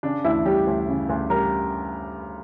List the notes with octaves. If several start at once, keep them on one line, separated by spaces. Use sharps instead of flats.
C#3 D4
D2 E4
G3 G4
D2
C#3
D2
G3 A#4